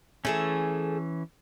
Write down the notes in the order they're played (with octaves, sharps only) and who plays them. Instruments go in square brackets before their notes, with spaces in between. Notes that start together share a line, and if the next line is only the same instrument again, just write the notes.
[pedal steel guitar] E3 C#4 [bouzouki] A3 G#4 A4